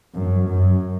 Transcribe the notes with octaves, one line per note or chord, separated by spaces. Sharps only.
F#2
F#2